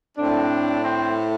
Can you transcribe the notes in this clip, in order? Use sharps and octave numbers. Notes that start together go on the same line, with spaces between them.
A2 A3 C4 D4
C4